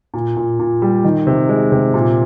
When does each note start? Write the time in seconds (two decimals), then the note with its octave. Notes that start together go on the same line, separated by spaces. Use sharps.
0.14 A#2
0.37 A#2
0.59 A#2
0.82 G3
1.04 D#3
1.27 C3
1.49 G#3
1.72 C3
1.94 A#2